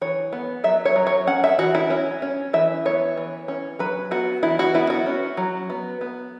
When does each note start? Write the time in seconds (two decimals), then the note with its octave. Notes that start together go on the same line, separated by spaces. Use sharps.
0.01 E3 C#5
0.33 B3
0.64 F#3 E5
0.85 C#5
0.96 F#3
1.07 C#5
1.27 C#4 F#5
1.44 E5
1.59 E3 F#4
1.75 E4
1.90 C#4
2.22 C#4
2.53 E3 E5
2.85 B3 C#5
3.17 E3
3.48 C#4
3.79 F#3 B4
4.11 B3 F#4
4.43 E3 E4
4.59 F#4
4.74 B3 E4
4.90 F#4
5.06 C#4
5.37 F#3
5.70 B3
6.01 B3